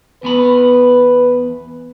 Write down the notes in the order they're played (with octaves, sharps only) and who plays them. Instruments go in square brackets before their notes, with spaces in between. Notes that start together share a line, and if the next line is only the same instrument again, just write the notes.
[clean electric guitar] E2 B3 B5 [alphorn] B4